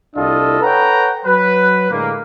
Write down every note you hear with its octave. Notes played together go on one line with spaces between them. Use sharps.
C2 D4 E4 F4 A4 D#5
A4 B4 C#5 F#5 G5 A#5
F#3 B4
A2 D3 G#3 A#3